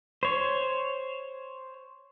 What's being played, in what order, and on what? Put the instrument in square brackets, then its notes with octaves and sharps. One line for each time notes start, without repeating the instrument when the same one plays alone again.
[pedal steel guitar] C5 C#5